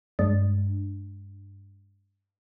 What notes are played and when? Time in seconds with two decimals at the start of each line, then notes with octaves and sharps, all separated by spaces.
0.19 G2 G#3 D4